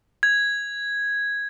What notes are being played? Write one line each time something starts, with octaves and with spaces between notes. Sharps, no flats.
G#6